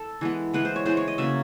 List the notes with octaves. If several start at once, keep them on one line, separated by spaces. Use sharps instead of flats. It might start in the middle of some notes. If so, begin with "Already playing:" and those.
Already playing: A4
E3 G#3 B3
E3 G#3 B3 B4
C5
C#5
E3 G#3 B3 C5
C#5
D#5
C#3 F#3 A#3 E5